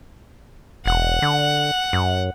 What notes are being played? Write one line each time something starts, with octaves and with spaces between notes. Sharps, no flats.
E1 F#5
D3
F#2